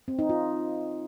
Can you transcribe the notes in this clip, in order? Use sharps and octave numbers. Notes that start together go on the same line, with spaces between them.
C4
D#4
F4